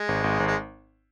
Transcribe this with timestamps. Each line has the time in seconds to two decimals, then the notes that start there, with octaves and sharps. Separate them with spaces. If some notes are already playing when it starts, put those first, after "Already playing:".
Already playing: G#3
0.08 G#1
0.24 G#1
0.40 G#1
0.47 G#3